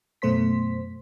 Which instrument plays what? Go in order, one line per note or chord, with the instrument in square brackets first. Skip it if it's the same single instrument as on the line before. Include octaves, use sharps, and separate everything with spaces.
[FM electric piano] F#2 B2 A3 C5 C6 B6